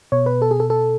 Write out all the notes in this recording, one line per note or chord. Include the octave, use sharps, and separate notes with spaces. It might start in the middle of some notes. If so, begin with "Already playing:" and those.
B2 C#5
B4
A4
G#4
A4
A4